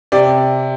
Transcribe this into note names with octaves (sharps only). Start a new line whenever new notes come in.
C3 D5